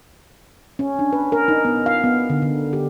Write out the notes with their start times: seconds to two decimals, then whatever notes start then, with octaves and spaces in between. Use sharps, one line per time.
0.79 C#4
0.99 D4
1.13 B4
1.32 A#4
1.48 D#4
1.65 B3
1.86 F5
2.04 B3
2.30 D3
2.42 D3
2.73 G4